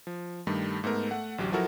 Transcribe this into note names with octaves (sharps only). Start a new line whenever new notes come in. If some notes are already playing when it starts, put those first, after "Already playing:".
F3
G2 D#3 G3 A3
G#2 A3 B3 A#4
A3 F#5
A1 D2 F#3 G4
F3 F#3 E4 F#4 A4 A#4